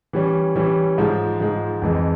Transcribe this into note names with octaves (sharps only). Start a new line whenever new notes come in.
E3 G3 C#4
E3 G3 C#4
G#2 F3 G#3
G#2 F3 G#3
F2 E3 G#3